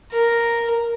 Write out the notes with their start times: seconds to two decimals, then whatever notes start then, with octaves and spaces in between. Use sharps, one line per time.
0.12 A#4